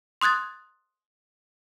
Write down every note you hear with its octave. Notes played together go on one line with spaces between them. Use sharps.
C6 D#6 F#6 G#6 A6